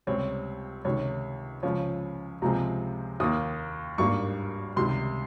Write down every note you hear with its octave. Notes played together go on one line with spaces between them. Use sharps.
C#2 C3 G3 C4 C#5
C#2 C3 D#3 C#5
C#2 C#3 F3 C#5
C#2 C3 F3 G#3 C4 A#5
D#2 D#3 A#3 D#6
G#1 G2 G3 A#3 C#6
C#2 C3 D#3 G3 C6